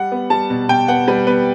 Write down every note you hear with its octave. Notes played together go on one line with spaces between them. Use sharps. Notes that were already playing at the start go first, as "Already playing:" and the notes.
Already playing: G3 F#5
B3
G3 A5
B2
B2 G5
B3 F#5
G3 B4
B3 B4